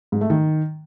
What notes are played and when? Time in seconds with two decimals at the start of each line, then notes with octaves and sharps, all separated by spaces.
0.12 G#2
0.21 A3
0.30 D#3